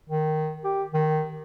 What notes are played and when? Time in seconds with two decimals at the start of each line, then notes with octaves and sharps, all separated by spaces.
0.09 D#3
0.64 G4
0.93 D#3